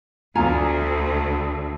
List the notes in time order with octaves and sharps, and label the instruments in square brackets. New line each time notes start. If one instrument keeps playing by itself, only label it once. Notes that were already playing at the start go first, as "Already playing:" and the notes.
[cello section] D2 [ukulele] F4 G#5 A#5